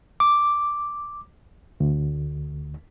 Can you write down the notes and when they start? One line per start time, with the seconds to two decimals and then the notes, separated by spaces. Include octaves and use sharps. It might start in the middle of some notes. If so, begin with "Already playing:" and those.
0.20 D6
1.80 D2